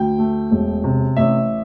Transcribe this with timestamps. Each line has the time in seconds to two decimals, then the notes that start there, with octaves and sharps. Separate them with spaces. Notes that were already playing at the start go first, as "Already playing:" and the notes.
Already playing: D2 G5
0.18 A3
0.51 E1
0.84 C3
1.16 A1 E5